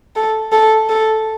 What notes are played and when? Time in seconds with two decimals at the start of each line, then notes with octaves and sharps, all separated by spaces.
0.16 A4
0.52 A4
0.89 A4